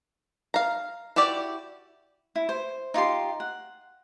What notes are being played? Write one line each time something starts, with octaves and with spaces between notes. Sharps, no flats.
F5 A#5
E4 F#4 G4 D5
E4
C5
D#4 F4 G4 C6
F#5